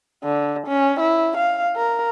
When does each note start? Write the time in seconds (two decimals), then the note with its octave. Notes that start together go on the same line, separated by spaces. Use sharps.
0.24 D3
0.67 C#4
1.00 E4
1.37 F5
1.76 A#4